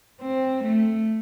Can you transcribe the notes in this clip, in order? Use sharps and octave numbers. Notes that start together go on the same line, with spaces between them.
C4
A3